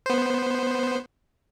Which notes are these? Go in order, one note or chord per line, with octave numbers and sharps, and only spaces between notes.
B3 C5